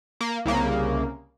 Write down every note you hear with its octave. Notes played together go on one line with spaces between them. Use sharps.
A#3
C2 C#3 A#3